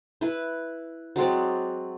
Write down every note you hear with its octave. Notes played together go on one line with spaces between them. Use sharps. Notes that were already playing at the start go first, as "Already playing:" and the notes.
E4 B4
F#3 G#3 C4 D5